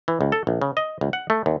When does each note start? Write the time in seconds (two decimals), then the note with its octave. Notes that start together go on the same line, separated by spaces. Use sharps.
0.08 E3
0.21 C#2
0.32 A4
0.47 A#1
0.61 C#3
0.77 D#5
1.01 C#2
1.13 F#5
1.30 A3
1.46 D#2